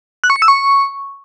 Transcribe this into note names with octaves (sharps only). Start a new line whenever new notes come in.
F#6
C#6
C#7
E6
C#6